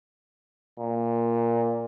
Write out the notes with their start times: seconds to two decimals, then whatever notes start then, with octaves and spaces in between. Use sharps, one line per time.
0.79 A#2